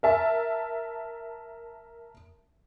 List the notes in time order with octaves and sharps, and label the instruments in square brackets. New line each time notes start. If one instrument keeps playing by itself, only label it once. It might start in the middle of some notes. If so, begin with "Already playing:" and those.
[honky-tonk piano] A#4 E5 A5